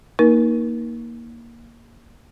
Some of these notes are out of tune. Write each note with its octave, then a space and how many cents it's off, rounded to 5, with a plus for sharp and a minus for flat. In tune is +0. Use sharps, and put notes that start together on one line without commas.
A#3 +5 D#4 +15 A#4 +35